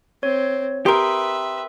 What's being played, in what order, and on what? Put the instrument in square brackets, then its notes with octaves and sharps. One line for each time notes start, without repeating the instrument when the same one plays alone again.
[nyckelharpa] C4 [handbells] C#5
[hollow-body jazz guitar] G4 A#4 [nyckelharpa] B4 E5 [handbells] C6 D#6